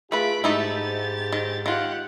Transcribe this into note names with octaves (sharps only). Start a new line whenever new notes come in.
A3 F4 G#4 B4 B5 D7
G#2 A3 D#4 E4 G4 A6
D#3
D#3 F4 G4 F#5